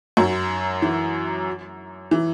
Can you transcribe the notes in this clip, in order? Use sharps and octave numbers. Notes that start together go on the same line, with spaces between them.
F#2 F#3
E3
E3